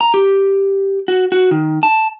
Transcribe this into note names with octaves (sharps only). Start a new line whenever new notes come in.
A#5
G4
F#4
F#4
D#3
A5